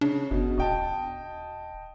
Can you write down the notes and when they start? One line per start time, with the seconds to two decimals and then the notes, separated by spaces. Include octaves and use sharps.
0.01 C#3 D4
0.31 G1 B2
0.58 D#1 D#5 G5 A5